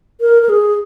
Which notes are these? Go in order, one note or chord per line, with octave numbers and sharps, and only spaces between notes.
A#4
A#4
G#4